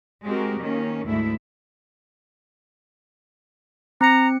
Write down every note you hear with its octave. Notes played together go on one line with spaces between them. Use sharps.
G#3 C4 F#4 G4 A#4
D#3 A#3 C#4
D2 G#2 A3 E4 E5
C4 A#5 C#7